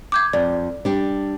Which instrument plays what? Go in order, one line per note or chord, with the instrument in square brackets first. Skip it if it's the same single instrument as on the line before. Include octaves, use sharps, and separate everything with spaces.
[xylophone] D6 G6 G#6
[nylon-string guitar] F2 [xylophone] D5
[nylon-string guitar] G3 D4